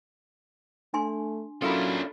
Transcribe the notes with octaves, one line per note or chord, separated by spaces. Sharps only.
A3 D4 G#5 C6
F#3 C#4 D4 E4 F4 A4 A#4 B5